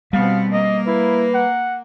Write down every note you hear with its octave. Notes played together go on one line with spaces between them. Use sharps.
B2 G3 B3 C4 F5
A#3 D#5
E4 B4
F#5